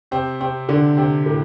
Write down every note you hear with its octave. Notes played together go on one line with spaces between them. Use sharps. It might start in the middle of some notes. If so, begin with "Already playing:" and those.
C3 C4
C3 C4
D3 D4
C3 C4
A2 A3